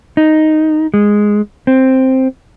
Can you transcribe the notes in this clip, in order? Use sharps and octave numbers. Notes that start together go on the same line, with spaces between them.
D#4
G#3
C4